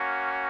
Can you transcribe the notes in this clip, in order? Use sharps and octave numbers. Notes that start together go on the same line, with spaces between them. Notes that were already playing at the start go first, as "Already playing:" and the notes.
Already playing: A#3 C#4 F#4